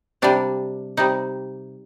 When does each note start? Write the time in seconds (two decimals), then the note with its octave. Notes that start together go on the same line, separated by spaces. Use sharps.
0.22 C3 G3 D4
0.97 C3 G3 D#4